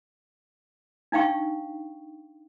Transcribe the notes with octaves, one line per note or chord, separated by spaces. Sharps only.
D4 D#4 F5 G5 C#6